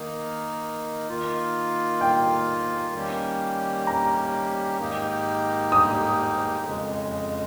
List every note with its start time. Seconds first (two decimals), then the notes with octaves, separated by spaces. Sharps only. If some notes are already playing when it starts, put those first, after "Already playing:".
Already playing: D#3 A#3 D#4
1.09 D#3 A#3 F4
2.01 G5
2.95 D#3 G3 A#3 C#4 G4
3.87 A#5
4.79 G#2 D#3 A#3 D#4 G4
5.72 D#6
6.65 F2 C#3 G#3